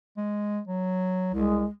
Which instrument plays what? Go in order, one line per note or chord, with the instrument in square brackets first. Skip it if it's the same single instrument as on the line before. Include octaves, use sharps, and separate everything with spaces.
[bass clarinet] G#3
F#3
[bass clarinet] C2 [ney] G#3